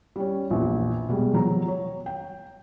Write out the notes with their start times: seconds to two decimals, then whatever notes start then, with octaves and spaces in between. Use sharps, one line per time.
0.16 G3 C#4
0.51 A#1 E2
1.08 B2 G3 G#3
1.34 F3 F#3 A#5
1.68 C#5
2.06 G5